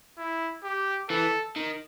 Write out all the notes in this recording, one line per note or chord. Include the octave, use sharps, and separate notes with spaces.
E4
G4
E3 A4
D#3